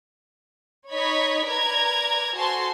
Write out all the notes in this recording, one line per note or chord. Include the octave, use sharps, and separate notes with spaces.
D#4 C#5 D#5 B5 G#6 B6
A#4 B4 D5 A#5 G#6
F#4 A4 C5 G#5 A5 C6